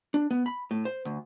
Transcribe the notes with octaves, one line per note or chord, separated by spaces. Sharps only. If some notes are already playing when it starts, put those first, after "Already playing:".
D4
B3
B5
A2
C5
D2